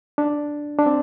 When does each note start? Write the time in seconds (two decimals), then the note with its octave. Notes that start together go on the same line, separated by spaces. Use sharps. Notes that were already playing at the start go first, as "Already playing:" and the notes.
0.18 D4
0.79 D4
0.86 C4